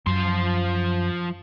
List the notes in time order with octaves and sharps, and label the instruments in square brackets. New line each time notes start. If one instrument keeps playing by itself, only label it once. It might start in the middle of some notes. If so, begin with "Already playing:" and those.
[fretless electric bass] F#2 [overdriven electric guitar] F3 C6